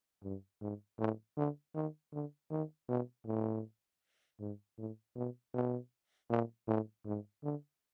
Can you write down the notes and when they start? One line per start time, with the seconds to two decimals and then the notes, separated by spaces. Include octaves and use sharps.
0.23 G2
0.61 G#2
0.99 A2
1.37 D3
1.75 D#3
2.13 D3
2.51 D#3
2.89 B2
3.26 A2
4.40 G#2
4.78 A2
5.16 B2
5.54 B2
6.30 A#2
6.68 A2
7.05 G#2
7.43 D3